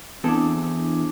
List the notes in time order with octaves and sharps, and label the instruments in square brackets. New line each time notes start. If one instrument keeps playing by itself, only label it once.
[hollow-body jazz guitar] E2 C4 A4 [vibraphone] D4 E4 D6